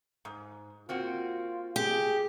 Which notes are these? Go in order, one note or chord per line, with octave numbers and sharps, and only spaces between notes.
G#2
A#3 C4 F4 F#4
G4 G#4